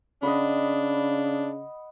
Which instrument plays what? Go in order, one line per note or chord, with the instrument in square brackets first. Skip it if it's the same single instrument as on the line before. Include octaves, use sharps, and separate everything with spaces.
[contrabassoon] C#3 [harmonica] D4 [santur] D#5 F#5 B5